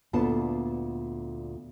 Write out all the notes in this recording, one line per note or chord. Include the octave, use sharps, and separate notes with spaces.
D2 A#2 B3 D4 F4 A5